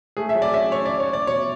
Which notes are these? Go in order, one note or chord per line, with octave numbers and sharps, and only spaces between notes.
A3 G#4
E5
F#3
D5
C#4 E5
C#4 C#5
C#4 D5
C#5
C#4 D5
B2 C#5